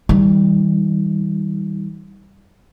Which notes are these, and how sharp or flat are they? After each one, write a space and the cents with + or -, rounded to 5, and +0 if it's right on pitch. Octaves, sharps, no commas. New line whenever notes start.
D#3 +45 G3 +0